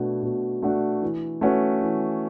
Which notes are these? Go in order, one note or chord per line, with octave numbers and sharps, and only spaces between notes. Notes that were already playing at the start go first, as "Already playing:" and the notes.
Already playing: B2 A3 D4 F#4
B2
A3 D4 F#4
E3
A3 C#4 F#4 B4
E3